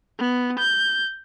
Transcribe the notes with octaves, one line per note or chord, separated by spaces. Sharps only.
B3
G6